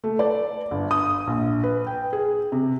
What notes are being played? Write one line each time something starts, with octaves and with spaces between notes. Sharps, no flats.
A3
D5
G1
D#6
A#1
B4
G5
G#4
C3